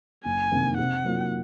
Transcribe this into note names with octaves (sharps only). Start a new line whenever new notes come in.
F#1 G#5
F2 C3 D#3 A#3
C3 F#5
F#3 A#3 F4